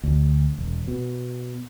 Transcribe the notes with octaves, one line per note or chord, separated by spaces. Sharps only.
D2
E1
B2